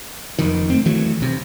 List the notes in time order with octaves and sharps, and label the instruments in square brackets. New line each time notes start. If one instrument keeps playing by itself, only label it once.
[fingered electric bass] F#1 F2 D#3
A3 B3 C4
D#3 E3 F#3 A3
B1 C3